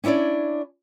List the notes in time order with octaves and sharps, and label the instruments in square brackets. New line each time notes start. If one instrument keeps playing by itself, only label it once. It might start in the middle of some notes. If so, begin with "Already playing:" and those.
[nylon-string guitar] C#4 D4 E4 C#5 D5